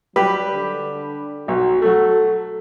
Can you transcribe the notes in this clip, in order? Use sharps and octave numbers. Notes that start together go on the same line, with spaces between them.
F#3 G3 G4 B4
D3
B1 F#4
F#3 A3 A4